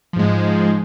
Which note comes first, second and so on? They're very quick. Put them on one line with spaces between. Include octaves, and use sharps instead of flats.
F3 G#2 G#3